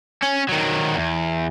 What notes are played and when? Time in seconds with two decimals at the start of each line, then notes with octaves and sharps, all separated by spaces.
0.23 C#4
0.49 D#3 F#3
0.95 E2